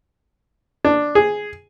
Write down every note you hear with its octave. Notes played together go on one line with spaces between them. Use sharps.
D4
G#4